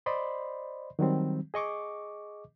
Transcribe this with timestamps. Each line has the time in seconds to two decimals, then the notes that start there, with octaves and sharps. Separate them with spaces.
0.06 C5 D5 D#5 B5 C6
0.99 D#3 F#3 G3 C4
1.54 G#4 D#5 C#6 D6